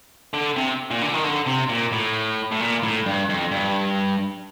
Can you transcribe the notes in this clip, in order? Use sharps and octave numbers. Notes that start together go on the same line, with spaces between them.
D3
C3
A#2
D3
D#3
D3
C3
A#2
A2
A2
A#2
A2
G2
F2
G2